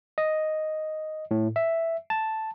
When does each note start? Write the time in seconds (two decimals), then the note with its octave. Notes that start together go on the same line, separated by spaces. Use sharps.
0.18 D#5
1.31 A2
1.56 E5
2.10 A5